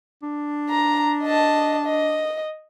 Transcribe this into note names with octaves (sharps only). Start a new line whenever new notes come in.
D4
A#5
D#5 A5
D#5